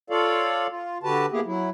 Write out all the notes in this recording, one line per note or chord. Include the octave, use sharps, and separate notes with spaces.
F4 A4 C#5 D5 F5
F4
D3 F#4 G4 B4 A5
A#3 B3 E4 G4 G#4
F#3 E4